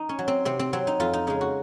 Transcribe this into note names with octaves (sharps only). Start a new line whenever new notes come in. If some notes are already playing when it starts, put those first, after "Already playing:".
Already playing: D#4
C#4
F#3
C4
C3 C4
C4
F#3 C4
D#4
F2 F4
D#4
C#3 G#3 D#4
F#4